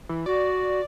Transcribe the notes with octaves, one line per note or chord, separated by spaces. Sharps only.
E3
F#4 D5